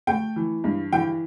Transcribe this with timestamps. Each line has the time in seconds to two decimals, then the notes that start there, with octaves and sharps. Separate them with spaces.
0.07 A3 G5
0.36 E3
0.64 G2
0.93 E3 G5